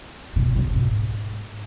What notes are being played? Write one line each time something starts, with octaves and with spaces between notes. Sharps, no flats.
B2
B2
G#2